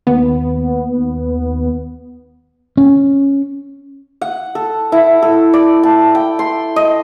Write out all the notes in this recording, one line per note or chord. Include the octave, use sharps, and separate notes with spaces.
D#2 B3
C#4
F#5
A4
E4
A4
D5
A5
G5
C6
D#5